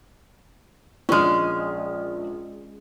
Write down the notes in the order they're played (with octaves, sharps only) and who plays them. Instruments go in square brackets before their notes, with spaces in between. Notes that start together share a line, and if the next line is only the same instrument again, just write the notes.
[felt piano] A#1 F6 [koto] G#3 C#4